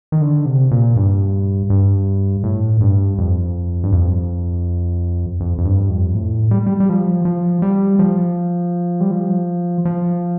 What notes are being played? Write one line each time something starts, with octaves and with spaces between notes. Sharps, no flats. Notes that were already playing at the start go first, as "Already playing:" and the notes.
D#3
D3
C3
A#2
G2
G2
A2
G2
F2
G2
F2
F2
F2
G2
F2
A2
G3
G3
G3
F3
F3
G3
F3
G3
F3
F3